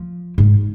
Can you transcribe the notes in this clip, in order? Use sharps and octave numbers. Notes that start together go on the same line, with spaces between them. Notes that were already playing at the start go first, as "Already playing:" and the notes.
Already playing: F3
G#2